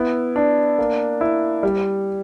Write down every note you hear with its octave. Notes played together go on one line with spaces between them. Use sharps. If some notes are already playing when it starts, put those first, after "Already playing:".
Already playing: B3 E4
D4
A#3
E4
G3